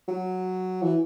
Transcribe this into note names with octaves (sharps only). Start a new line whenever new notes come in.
F#3
E3